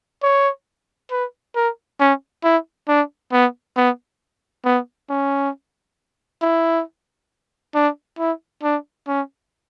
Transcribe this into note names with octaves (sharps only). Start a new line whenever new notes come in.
C#5
B4
A#4
C#4
E4
D4
B3
B3
B3
C#4
E4
D4
E4
D4
C#4